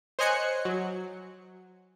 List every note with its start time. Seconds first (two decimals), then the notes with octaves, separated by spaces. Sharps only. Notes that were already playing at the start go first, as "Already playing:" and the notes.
0.19 C5 C#5 D#5 G#5 F#6 C#7
0.65 F#3